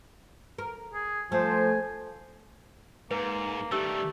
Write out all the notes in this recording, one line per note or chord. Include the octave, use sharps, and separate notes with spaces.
A#4
G#4
F3 A3 C5 G#5
G#2 A#3 B4
D#3 G3 A3 C#4 G4 E6